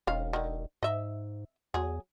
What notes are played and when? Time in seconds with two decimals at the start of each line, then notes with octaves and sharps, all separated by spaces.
0.07 E1 D#3 C#4 F5
0.33 D3 D#3
0.83 G#2 D#5 E5
1.74 E2 F#3 G#4